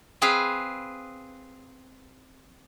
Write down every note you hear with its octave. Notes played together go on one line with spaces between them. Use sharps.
C4 G#4 B4 F5